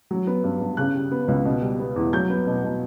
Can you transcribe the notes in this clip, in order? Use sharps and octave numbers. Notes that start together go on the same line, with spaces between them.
F#3
B3
G2
G2
C#3 F#6
G3
B3
C#2
B2
G3
B3
E2
F#3 G6
B3
B2
B2